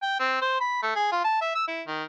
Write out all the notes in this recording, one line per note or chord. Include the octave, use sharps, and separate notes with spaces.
G5
C4
C5
B5
A3
G#4
F4
A5
E5
E6
E4
D#3